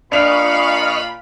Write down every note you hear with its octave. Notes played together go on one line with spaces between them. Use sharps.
A#2 D4 D#5 F5 B5 C#6 F6 F7